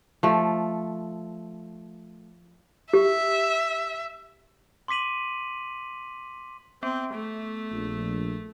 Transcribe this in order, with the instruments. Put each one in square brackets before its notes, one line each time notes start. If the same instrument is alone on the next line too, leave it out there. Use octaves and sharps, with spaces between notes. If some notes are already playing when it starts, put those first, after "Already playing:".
[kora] F3 A3
[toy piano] G4 [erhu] E5
[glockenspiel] C6 D6 B6 D#7 F#7
[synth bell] B3 [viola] C4
[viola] A3
[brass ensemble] A#1